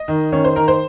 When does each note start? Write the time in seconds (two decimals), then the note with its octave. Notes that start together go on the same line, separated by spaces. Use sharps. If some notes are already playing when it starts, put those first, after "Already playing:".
Already playing: D#5
0.08 D#3
0.32 D#3 C#4 C#5
0.44 C5
0.56 D#3 A#4
0.68 C5